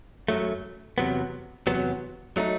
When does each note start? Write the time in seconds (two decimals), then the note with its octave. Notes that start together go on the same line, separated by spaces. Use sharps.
0.28 F#2 F#3 A3
0.98 E2 C3 F#3 B3
1.67 E2 C3 F#3 B3
2.37 F#3 A3 D#4